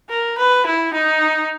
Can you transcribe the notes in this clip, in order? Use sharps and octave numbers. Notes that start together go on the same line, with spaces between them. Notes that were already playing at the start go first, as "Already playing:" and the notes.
A#4
B4
E4
D#4